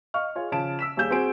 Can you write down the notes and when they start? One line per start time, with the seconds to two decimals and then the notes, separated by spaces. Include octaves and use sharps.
0.14 D#5 F5 C#6 F6
0.35 F4 G#4 C#5
0.52 C#3 F3 A5 D7 E7
0.79 E6 B6 E7
0.97 D#2 G3 G#4 F5 G6 E7
1.11 C4 F#4 G#4 D7